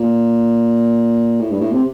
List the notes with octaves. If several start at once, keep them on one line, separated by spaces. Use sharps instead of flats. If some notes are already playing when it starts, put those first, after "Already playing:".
Already playing: A#2
A2
G2
A2
C3